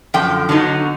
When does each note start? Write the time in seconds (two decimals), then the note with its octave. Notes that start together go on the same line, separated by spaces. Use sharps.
0.14 F#2 D3 F3 G5
0.49 D3 F#3 B3 D#4